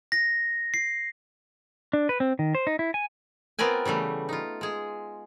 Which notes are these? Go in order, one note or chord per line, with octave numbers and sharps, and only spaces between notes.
A#6
C7
D4
B4
C4
D#3
C5
D#4
E4
G#5
B3 C4 F4 A#4 D5 G#5
C#3 E3 G3 A3
D#4 F4
G#3 G#4